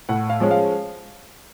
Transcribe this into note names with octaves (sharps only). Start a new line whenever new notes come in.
A2 F#5
F5
F3 G#3 C#4
F5